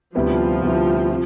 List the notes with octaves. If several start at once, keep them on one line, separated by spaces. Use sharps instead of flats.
D2 C3 F3 G3 B3 E4
D2 C3 G3 B3 E4
C3